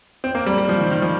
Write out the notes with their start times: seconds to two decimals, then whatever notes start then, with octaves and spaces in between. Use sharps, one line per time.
0.24 C4
0.35 A#3
0.46 G3
0.58 G3
0.69 F3
0.81 D#3
0.91 D#3
1.02 F3